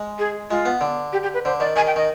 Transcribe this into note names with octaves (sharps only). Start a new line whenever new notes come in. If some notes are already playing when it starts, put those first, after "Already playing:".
Already playing: G#3
G#4
G#3 F4
B3
D3
G4
G4
B4
D3 C5
D#3 D5
D#3 G#5
G5
D#3 D#5